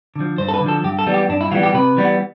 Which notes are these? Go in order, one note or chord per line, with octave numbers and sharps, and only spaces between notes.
D3 F3
G2 C5
A4
B4
D3
F3 A4
G2 G4
A4
E3 G3 B3
G4
G2 D4
E4
E3 G3 B3 F4
G4
C3 B4
E3 G3 B3